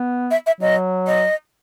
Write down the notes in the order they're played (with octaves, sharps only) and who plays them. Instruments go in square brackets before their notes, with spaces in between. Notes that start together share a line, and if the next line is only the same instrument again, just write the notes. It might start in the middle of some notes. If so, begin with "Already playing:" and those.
Already playing: [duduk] B3
[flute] E5
E5
[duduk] F#3 [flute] D#5
[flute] D#5